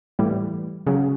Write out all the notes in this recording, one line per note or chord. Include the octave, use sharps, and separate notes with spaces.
A2 E3 G3
C#3 F#3